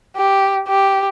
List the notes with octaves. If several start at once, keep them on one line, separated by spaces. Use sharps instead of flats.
G4
G4